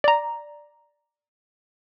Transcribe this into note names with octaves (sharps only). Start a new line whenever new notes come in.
D5 A#5